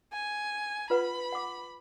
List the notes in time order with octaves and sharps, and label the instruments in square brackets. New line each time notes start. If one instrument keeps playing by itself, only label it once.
[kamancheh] G#5
[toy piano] F4 B4 F#5 [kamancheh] B5
[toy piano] F#5 D6